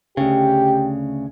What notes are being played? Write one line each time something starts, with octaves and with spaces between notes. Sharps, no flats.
D2 C#3 G4